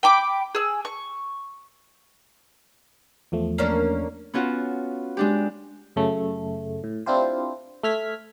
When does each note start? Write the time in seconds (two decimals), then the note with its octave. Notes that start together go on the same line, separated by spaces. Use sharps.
0.03 G5 B5 D6
0.55 G#4 E6
0.85 C#6
3.32 E2 F3 A3
3.58 A#3 C#4 D4
4.34 B3 C#4 F4 F#4
5.17 G#3 D4 G4
5.96 F#2 C#3 A3
6.84 A2
7.06 C4 D4 E4 F4 G4 C5
7.83 A3 E5 F6 G#6 B6